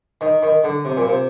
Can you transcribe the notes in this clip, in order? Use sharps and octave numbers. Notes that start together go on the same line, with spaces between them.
D#3
D#3
D3
C3
A#2
C3